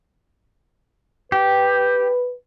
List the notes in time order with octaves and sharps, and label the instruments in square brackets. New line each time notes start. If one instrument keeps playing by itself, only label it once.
[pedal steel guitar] G4 [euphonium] B4